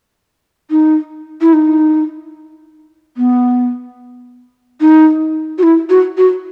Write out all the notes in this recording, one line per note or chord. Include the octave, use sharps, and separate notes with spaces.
D#4
E4
D#4
B3
D#4
F#4
E4
F#4
F#4